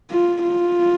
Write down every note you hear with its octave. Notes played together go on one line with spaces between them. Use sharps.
F4
F4